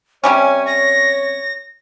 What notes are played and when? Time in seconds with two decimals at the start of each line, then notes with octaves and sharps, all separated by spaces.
0.24 C3 G3 C#4 C#5 G#5
0.67 A#6